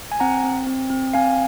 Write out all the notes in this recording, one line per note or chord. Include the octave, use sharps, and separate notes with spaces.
G#5
C4 F#5 A#5
C4
C4
C4
C4 F5 G#5